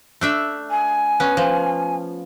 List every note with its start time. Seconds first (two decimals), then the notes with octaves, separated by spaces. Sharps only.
0.21 A3 D4 E5
0.70 G#5
1.20 B3 C#4
1.37 F3